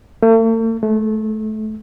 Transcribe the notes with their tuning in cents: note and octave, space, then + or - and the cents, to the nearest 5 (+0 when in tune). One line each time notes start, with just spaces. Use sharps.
A3 +45
A3 -25